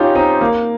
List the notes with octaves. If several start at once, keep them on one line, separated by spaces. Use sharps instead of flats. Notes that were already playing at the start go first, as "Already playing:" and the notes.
Already playing: C#4 D#4 F4 G4
C4 D#4
A#3